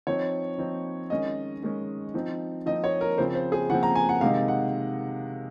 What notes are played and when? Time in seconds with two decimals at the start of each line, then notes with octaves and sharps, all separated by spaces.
0.07 F3 C4 D#4 C#5
0.58 F3 C4 D#4
1.10 D#3 G#3 C#4 D#5
1.62 D#3 G#3 C#4
2.14 F3 C4 D#4
2.66 F3 C4 D#4 D#5
2.84 C#5
3.01 A#4
3.18 C#3 F3 C4 C5
3.35 C5
3.52 G#4
3.70 C#3 F3 C4 F#5
3.83 A#5
3.95 G#5
4.09 F#5
4.21 C3 D#3 G#3 D#4 F5
4.48 F#5